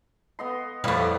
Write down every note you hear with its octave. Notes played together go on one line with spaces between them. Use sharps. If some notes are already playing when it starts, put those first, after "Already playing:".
B3 D#5 C6
F2 A2 G3 B4 F5